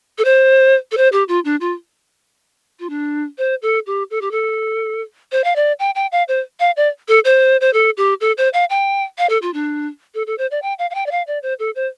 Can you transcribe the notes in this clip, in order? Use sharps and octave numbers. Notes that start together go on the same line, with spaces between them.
A4
C5
A4
C5
G4
F4
D4
F4
F4
D4
C5
A4
G4
A4
G4
A4
C5
F5
D5
G5
G5
F5
C5
F5
D5
A4
C5
C5
A4
G4
A4
C5
F5
G5
F5
A4
F4
D4
A4
A4
C5
D5
G5
F5
F5
G5
D5
F5
D5
C5
A4
C5